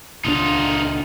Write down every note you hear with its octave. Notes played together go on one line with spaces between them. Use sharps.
D#1 C#2 D4 D#4 F4